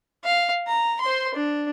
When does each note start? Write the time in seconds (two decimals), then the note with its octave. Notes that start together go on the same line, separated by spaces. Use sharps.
0.24 F5
0.67 A#5
1.01 C5 C6
1.35 D4